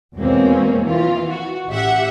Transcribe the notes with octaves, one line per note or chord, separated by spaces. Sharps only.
E2 B2 G#3 A#3 C4 C#4
E3 F4
F#4
A1 G4 E5 F#5